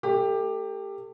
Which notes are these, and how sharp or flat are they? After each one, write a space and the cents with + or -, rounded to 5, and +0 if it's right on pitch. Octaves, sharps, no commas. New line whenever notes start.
A3 +40 G4 +15